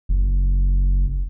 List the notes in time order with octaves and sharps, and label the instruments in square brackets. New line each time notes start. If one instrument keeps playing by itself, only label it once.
[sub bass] F#1